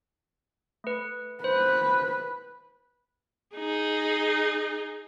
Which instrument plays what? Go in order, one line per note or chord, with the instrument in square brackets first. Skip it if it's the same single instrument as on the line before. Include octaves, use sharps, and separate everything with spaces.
[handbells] A3 B4
[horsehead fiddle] B4 [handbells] C5
[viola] D#4 G#4